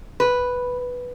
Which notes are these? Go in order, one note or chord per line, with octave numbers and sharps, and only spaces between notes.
B4